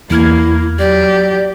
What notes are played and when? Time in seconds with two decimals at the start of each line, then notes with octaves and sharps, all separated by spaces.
0.10 E2 A#3 E4 F6 G#6
0.79 F#3 G4 D5